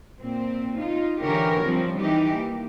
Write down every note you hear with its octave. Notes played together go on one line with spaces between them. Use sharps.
A#2 C4
D#4 F4
D3 E3 G4 A#4 C#5
F3 G3 C4
E3 D#4 G4
A#3